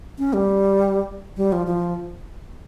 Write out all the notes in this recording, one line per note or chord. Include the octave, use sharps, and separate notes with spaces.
C#4
G3
G3
F3
F3